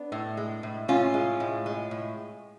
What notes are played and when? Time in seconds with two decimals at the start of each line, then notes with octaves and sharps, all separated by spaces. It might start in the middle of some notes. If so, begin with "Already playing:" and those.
Already playing: B3 D4
0.12 A2
0.37 G#3
0.63 A2
0.88 A2 C#4 F4
1.14 G#3
1.40 A2
1.66 G#3
1.91 A2